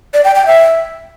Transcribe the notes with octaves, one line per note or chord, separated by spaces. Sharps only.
D5
G5
G5
E5